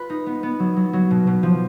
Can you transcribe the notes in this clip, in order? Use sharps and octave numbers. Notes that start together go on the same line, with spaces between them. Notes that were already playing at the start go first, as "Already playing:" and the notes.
Already playing: F4 B4
D#4
B3
B3
F#3
F#3
F#3
B2
B2
F3